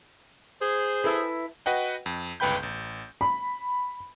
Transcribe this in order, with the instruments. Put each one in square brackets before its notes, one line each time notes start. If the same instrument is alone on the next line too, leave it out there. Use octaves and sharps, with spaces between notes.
[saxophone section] G#4 C5
[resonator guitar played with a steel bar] E4 A4 B4
[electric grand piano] F#4 B4 D#5 F#5 G5
F2
G1 C#2 B4 G5 B5 G6
A1
[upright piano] B5